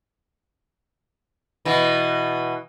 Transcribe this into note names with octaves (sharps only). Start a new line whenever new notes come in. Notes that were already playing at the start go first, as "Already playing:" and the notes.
B2 E3